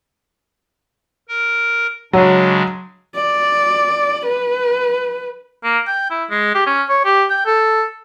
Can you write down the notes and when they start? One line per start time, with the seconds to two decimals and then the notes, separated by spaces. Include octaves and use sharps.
1.29 A#4
2.13 C#3 F#3 G#3 D4
3.15 D5
4.26 B4
5.64 A#3
5.87 G5
6.10 E4
6.30 G#3
6.55 G4
6.66 C#4
6.89 C#5
7.05 G4
7.30 G5
7.46 A4